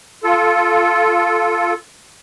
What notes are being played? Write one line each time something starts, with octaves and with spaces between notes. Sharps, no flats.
F4 A4